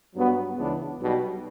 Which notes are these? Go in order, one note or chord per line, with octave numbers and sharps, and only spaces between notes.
G2 F#3 B3 F#4
C#2 C#3 E3 B3 D4
B1 B2 G3